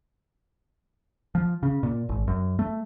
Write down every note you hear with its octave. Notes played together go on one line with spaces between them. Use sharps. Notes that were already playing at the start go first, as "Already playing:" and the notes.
F3
C#3
A#2
G#1
F#2
A3